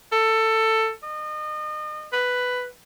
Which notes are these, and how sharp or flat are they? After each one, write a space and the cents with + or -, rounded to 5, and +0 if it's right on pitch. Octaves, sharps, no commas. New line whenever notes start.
A4 +15
D#5 -35
B4 +5